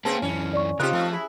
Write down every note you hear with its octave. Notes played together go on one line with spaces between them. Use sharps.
C#3 A#3 C4 G#4 B4 A5
F#2 E3 C#4
D5 C#6
C#3 C4 D#4 F4 G4 A#4 F#6
F3 A3
E4 G#4